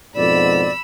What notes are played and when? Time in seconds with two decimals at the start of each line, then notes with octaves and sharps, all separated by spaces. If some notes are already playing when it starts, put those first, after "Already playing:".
0.15 F2 G#2 B2 D5 B5 E6